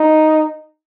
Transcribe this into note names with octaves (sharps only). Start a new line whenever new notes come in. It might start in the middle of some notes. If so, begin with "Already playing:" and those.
Already playing: D#4